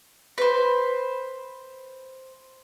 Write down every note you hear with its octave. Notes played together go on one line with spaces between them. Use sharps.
B4 C5